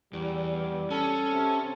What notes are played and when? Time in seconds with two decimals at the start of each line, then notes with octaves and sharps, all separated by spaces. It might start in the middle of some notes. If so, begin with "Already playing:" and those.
0.13 E2 G3
0.90 C#4 A4
1.31 C3